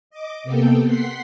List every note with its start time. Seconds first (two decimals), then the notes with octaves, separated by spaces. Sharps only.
0.10 D#5 D6
0.44 C3 A#3 B3 A4 G5
0.86 F#5 C6 B6 C7